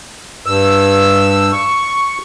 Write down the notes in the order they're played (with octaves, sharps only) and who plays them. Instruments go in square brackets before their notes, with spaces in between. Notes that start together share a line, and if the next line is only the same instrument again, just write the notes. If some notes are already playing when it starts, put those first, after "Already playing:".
[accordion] G2 E6
C#6